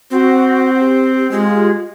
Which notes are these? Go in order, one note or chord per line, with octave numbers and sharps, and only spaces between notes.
C4 F#4
G4
G#3 F4 G4 G#4